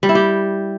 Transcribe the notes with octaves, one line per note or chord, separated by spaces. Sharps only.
G3
E4
G4